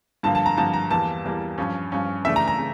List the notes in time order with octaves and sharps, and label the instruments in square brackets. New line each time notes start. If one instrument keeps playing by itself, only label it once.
[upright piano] G2 D3 F3 A#3 A5
A5
A#5
G2 D3 F3 A#3 A5
A#5
E2 E3 G3 A#3 A5
E2 E3 G3 A#3
G2 F3 C#4
G2 F3 C#4
C#3 E3 A3 D4 E5
A#5
A#5
C#3